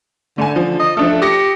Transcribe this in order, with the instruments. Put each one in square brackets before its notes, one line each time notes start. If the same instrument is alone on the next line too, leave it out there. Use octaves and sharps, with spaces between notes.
[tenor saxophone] D3 [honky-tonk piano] A3 G#5
[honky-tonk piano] F3
[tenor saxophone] D#5
[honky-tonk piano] F3 D4 A4 [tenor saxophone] A3
[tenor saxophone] G4 [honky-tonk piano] D#6 A#6 C#7